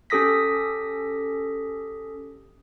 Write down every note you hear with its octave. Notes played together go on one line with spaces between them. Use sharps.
C#4 G4 A4 D#6 A#6 B6